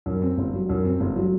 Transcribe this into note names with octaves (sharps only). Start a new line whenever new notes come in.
F#2
C4
G1
F#3
F#2
C4
G1
F#3